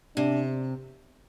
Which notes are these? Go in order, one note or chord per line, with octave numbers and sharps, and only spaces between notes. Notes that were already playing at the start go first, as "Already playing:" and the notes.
C3 D4